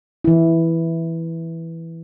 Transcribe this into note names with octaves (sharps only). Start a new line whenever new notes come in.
E3 E4